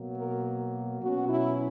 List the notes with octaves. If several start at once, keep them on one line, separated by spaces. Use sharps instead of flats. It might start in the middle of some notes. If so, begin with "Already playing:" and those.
Already playing: B2 F#3 A#3
A#4
B2 F#3 C#4 F#4
E4